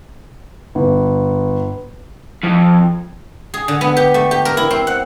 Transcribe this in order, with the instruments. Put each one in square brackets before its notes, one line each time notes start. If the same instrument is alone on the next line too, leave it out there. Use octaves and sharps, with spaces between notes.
[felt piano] G1
[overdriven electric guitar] F2
[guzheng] G#4
D3
B3
G4
A3
G4
A#4
E4
C4
F#5